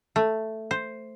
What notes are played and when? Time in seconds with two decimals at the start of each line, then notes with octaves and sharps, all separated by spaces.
0.16 A3
0.71 C5